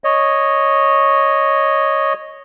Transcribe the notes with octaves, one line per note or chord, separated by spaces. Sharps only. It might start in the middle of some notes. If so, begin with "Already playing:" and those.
C#5 D#5